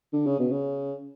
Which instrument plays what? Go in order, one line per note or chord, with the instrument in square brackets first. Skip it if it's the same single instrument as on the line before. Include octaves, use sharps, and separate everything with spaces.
[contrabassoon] D3
C#3
B2
C#3